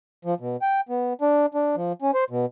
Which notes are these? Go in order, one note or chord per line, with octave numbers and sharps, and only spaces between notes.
F3
B2
G5
B3
D4
D4
F3
C#4
C5
B2